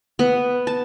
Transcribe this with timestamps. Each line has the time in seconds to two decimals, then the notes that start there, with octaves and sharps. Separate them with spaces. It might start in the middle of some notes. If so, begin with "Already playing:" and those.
0.19 B3
0.67 A5